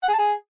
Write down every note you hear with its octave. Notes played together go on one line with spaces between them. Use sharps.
F#5
G#4
A5
G#4